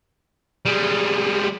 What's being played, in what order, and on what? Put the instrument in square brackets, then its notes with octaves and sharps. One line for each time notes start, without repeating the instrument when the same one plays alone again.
[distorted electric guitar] G3 G#3